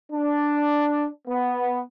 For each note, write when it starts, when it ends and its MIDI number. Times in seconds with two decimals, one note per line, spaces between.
0.12 1.08 62
1.28 1.80 59